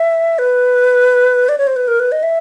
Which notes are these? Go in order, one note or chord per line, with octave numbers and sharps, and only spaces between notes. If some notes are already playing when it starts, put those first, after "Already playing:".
Already playing: E5
B4
D5
C#5
C5
B4
A#4
B4
D#5
E5